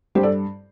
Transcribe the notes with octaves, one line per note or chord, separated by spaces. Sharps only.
G2 G4 C5
A4 D5